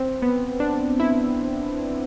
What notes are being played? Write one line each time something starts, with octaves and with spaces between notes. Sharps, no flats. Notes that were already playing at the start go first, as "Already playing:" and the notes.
Already playing: C4
B3
D4
E4